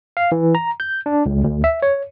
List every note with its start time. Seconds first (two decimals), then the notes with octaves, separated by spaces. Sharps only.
0.17 F5
0.32 E3
0.55 A#5
0.80 G6
1.06 D4
1.26 C#2
1.44 D2
1.64 E5
1.82 C#5